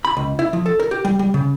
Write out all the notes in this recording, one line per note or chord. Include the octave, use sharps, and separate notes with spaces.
B5
C#2
E4
F3
A4
A#4
G4
G3
G3
C#3